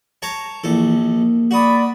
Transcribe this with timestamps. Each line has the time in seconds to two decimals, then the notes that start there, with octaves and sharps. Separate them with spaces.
0.22 C#5 A5 A#5
0.64 A#1 E3 A4
0.98 A#3
1.51 F#4 D5 B5 D#6